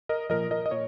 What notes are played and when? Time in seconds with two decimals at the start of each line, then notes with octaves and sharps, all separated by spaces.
0.09 A#4 D#5
0.30 A#2 F3 A#4 D#5
0.51 A#4 D#5
0.66 D#5
0.71 A#2 C#5